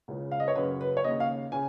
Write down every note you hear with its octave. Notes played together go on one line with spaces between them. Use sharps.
C#2 C#3
F5
D#5
C#5
F#2 C#3 B4
B4
C#5
D#2 C#3 D#5
F5
C#3 G#5